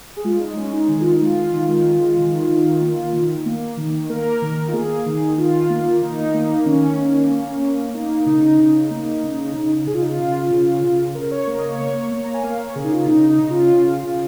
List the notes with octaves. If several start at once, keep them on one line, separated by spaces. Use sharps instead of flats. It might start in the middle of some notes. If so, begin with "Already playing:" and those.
G#4
G#3 F4
D#4
D#4
G#3 C#4
D#4
D#3 G#4
F4
D#4
G#3 F4
D#3
G#3
D#3
D#3
A#3
D#3
A#3
D#3
A#3 A#4
D#3
F4
A#3 G#4
D#3
D#3 F4
A#3
D#3 D#4
A#3
D#3 C#4
A#3
A#3
A#3
A#3 D#4
C#3 D#4
C#3
A#3
C#3
C#3
C#3 G#4
F4
D#4
F4
C#3
C#3
C#3
C#3 A#4
C#5
A#3 A#4
D#5
C#5
A#3
A#3
A#5
G#5
A#3 F5
C#5
C#3 G#4
D#4
F4
C#3 D#4
D#4
C#3
F4
C#3
C#3